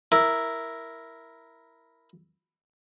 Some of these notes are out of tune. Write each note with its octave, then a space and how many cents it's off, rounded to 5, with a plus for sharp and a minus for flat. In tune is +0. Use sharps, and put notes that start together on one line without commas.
E4 +0 A#4 +0